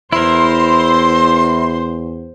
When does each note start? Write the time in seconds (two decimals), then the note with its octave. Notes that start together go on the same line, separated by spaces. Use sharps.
0.12 E2 E4 A#4 C5 C6